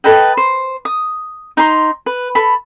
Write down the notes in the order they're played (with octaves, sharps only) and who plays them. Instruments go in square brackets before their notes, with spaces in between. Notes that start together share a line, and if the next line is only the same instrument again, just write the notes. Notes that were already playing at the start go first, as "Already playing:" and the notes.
[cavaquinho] A4 B4 D#5 G5
C5
D#6
D#4 A#5 C6
B4
A4 B5